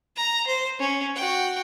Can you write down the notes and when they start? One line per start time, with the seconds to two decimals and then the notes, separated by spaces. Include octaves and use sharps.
0.16 A#5
0.47 C5
0.79 C#4
1.16 F#4 G5